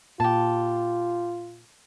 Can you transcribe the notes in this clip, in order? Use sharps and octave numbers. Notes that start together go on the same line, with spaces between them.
A#2 F4 G4 A5